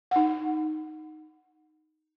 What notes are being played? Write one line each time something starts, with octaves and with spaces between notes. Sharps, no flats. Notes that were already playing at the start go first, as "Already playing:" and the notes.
D#4 F#5